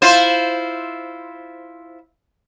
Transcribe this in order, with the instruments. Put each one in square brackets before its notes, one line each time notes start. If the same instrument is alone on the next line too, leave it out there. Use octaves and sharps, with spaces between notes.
[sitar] E4 F4 C5